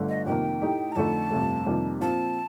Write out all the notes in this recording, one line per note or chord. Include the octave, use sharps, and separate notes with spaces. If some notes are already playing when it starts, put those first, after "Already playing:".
Already playing: G1 D3 A3
D#5
F2 C3 D#3 A#3 G5
A2 A3 D#4 G4
A#5
F2 D3 A3 D#4 A5
G1 F2 C3 F3 A3
F2 C3 D#3 G3 A#3
A#2 F3 C4 F4 A5